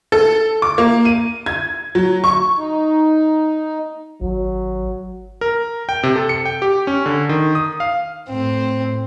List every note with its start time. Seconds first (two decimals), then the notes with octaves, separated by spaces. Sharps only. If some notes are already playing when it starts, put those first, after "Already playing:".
0.12 A4
0.62 D6
0.78 A#3
1.05 D#7
1.46 G#6
1.95 F#3
2.24 C#6
2.57 D#4
4.21 G#1 F#3
5.41 A#4
5.89 G5
6.03 C3
6.15 A4
6.29 C#7
6.45 G5
6.62 G4
6.87 C#4
7.06 D3
7.29 D#3
7.55 D#6
7.80 F5
8.29 A2 C4